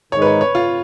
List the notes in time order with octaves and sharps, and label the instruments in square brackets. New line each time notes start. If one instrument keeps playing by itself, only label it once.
[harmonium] G#2 D#3 G#3 D#4 [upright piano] C#5
[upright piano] B4
C#5
C#5
F4